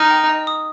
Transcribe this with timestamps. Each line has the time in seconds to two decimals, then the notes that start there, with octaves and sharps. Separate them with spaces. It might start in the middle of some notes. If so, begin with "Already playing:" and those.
Already playing: D#4 F6
0.10 G5
0.29 D#5
0.47 D#6